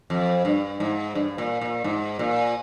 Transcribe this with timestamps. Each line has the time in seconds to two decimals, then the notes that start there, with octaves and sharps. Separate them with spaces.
0.10 F2
0.45 G2
0.80 G#2
1.15 G2
1.38 A#2
1.61 A#2
1.84 G#2
2.19 A#2